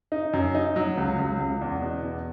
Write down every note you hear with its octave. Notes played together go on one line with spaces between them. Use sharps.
D#4
F#2
D#4
F#3
C#2
C#2
C#2
E2
B2
E2